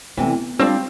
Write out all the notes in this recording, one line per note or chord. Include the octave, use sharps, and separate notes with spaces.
D2 C3 E3 B3
G3 C4 D4 F4